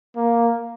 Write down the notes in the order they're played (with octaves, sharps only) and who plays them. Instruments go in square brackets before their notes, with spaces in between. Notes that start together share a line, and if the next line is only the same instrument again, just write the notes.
[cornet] A#3